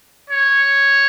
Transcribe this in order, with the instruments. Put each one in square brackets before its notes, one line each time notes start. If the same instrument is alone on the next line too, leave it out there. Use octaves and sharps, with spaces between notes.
[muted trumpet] C#5